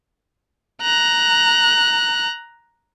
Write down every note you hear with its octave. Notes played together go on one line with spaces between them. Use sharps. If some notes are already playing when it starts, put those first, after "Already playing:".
A#5 F#6